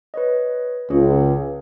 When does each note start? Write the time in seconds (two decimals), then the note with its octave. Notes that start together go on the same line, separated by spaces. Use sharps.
0.14 B4 C#5 D#5
0.90 C#2 C#4 G#4 C#5